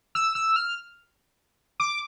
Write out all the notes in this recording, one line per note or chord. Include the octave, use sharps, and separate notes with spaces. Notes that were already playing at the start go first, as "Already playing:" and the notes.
E6
E6
F6
D6